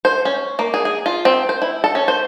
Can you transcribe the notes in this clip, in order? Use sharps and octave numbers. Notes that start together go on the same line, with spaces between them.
C5
C#4
A#3
G#4
G#4
F4
C4
C5
E4
A4
C#4
C5